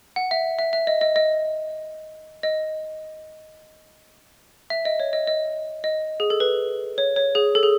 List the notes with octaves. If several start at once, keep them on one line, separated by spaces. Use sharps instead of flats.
F#5
E5
E5
E5
D#5
D#5
D#5
D#5
E5
D#5
C#5
D#5
D#5
D#5
G#4
A4
B4
C#5
C#5
G#4
A4
G#4